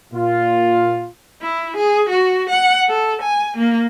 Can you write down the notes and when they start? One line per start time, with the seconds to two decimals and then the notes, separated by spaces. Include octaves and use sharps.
0.13 A#2 F4
1.42 E4
1.77 G#4
2.10 F#4
2.50 F#5
2.89 A4
3.22 G#5
3.58 A#3